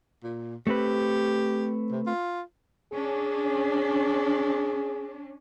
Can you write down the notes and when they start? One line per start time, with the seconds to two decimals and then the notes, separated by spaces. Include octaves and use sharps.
0.23 A#2
0.67 A3 C4 G4 B4
1.91 C3
2.07 F4
2.93 C#4 D4 G#4